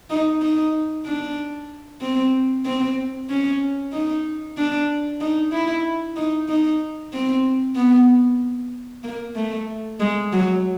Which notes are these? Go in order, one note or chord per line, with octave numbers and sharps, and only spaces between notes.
D#4
D#4
D4
C4
C4
C#4
D#4
D4
D#4
E4
D#4
D#4
C4
B3
A#3
A3
G#3
F#3